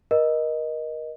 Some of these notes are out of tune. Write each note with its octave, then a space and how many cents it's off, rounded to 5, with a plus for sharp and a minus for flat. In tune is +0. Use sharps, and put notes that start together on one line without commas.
A#4 +30 D#5 +0